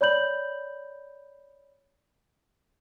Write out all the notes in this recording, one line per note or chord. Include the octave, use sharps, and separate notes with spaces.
C#5 D5 B5 G6 F#7